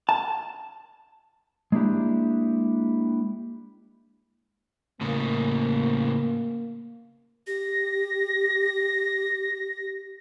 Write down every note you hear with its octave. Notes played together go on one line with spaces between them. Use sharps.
A5
G#3 A#3 D4 E4 G4
A2 C#3 A#3
G4 A#6